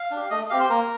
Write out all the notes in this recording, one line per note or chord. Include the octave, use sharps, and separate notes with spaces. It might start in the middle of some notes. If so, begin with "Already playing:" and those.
Already playing: F5
D4 G4
A3 D#5
C4 G4 F5
C5
A#3 A#4